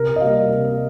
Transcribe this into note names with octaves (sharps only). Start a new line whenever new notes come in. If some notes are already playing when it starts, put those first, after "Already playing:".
Already playing: C3 A#4
D#5
G3 A#3 F5
C3